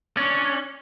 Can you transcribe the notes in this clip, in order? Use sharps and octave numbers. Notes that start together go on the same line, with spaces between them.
C#4 D4 C#5 D5